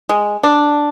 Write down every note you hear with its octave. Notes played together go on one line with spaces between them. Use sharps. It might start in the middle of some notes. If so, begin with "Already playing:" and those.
G#3
D4